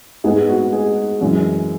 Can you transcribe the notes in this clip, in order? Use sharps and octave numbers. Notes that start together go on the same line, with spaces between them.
G#2 G#3 B3 G#4
F#4
G#4
F#2 E3 G#3